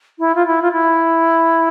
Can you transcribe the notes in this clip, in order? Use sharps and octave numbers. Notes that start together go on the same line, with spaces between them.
E4
F4
E4
F4
E4